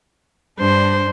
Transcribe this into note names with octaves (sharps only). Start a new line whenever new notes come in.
G2 D4 C5